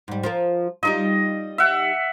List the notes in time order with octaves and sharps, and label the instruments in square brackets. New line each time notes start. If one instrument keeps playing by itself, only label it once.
[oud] G#2 G3
F3 F4 A#4
[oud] G3 D#4 F4 [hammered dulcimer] D#5
[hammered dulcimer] E5 F#5